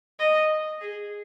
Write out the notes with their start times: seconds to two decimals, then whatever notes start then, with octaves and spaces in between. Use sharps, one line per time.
0.19 D#5
0.81 G#4